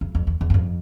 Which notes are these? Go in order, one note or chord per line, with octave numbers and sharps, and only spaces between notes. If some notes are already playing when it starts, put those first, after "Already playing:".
F2
F2
E2
E2
G2
F2